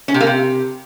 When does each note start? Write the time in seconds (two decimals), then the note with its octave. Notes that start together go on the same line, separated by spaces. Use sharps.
0.08 C#4
0.14 C3
0.21 A#3
0.27 C3